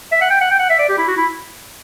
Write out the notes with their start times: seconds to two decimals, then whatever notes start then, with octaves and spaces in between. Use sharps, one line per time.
0.12 E5
0.21 F#5
0.30 G5
0.41 F#5
0.50 G5
0.59 F#5
0.70 E5
0.79 D5
0.89 G4
0.98 E4
1.08 F#4
1.17 E4